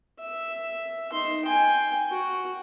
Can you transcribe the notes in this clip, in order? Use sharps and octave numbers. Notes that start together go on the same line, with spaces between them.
E5
D#4 C6
G5 G#5
F#4